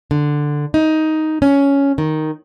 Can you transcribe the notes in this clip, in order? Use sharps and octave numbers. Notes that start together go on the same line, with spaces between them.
D3
D#4
C#4
D#3